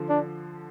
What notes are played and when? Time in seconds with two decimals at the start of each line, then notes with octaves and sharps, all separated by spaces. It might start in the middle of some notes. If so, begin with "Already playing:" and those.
Already playing: D3 F3
0.09 D4